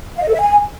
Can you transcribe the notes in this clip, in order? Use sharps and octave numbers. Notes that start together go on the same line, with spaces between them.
F5
D#5
A4
E5
G#5